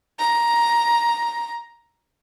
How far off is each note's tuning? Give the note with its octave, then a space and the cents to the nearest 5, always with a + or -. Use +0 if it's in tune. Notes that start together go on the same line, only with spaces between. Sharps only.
A#5 +10